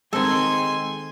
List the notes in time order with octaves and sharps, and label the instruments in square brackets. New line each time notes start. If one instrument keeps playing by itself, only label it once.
[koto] D#3 A4 [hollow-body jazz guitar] G#3 C4 [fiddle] G#5 C6